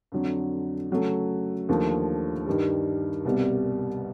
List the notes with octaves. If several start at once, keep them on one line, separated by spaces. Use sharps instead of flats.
F2 D3 F#3
C#3 F#3 A3
D#2 D3 F3 A3
G2 D#3 G3
C2 B2 G3